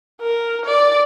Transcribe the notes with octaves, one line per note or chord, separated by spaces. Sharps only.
A#4
D5